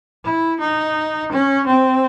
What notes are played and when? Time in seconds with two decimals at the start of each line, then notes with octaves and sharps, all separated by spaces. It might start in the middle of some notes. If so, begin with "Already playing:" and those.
0.25 E4
0.60 D#4
1.32 C#4
1.67 C4